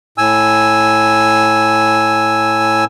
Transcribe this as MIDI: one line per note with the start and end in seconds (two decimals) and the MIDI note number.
0.18 2.85 45
0.18 2.85 80
0.18 2.85 88